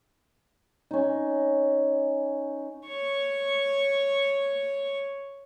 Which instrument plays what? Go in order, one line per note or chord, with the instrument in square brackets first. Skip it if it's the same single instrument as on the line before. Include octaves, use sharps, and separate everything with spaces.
[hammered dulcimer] C#4 D#4
[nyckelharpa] C#5 C#6